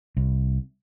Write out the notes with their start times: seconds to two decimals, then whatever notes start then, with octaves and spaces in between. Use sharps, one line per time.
0.17 C2